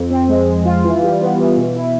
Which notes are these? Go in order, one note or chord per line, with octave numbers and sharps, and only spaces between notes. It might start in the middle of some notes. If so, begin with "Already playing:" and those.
Already playing: F2
C4
G#3
G#3
F4
E3
G3
B3
E3
B2
E4